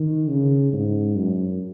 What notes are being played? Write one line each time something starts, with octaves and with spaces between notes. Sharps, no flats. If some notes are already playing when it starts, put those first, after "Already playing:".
Already playing: D#3
C#3
G#2
F#2